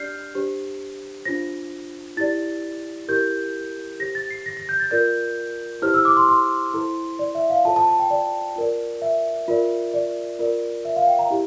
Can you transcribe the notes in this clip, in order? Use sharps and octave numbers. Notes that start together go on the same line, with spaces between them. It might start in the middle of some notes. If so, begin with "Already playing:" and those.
Already playing: D4 G4 D5 F6 G6 C7
D4 G4 C5
D4 F4 C5 A#6
E4 G4 D5 A6
E4 G4 A#4 G6
G4 C5 A#6
A6
C7
A#6
A#6
G6
A6
F4 A#4 D5 G6
E4 G4 C5 F6
E6
D6
C6
C6
E4 A4 C5
D5
E5
F5
F4 A4 C5 A5
A5
A5
G5
D5
F4 A#4 D5
E5
F4 A#4 D5
D5
F4 A#4 D5
E5
F5
G5
A#5
E4 G4